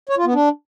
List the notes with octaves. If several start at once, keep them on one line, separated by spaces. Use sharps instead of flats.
C#5
F4
B3
D4